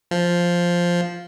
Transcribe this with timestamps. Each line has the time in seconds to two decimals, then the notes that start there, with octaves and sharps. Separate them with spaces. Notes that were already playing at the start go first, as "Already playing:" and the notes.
0.11 F3